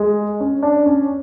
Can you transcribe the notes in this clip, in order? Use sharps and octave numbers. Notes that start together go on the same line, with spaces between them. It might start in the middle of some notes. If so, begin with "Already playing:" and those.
Already playing: G#3
C#4
D4
C#4